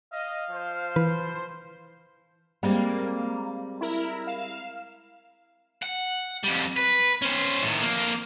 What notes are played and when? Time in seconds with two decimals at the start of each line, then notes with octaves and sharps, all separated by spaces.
0.13 D#5 F5
0.50 F3 C5
0.96 E3 B4
2.63 G3 G#3 A#3 C4
3.81 E4 A#4
4.27 F5 E7
5.82 F#5
6.44 F2 G3
6.77 B4
7.22 C#4 C5
7.62 A2 D#3
7.81 F2 A#3